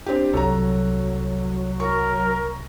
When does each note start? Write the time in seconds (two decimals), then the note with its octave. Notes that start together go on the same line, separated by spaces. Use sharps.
0.06 C4 D4 G4
0.33 C2 F#3 A4 A#5
1.80 A#4 C#6